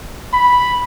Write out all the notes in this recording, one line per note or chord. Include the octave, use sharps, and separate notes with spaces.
B5